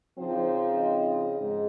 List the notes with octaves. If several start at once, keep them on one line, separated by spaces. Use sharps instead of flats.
C#3 F3 C4 D#4 C5
D#5
G#2